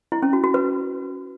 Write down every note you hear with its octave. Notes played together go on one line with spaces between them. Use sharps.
E4
C#4
F#4
F#4
B4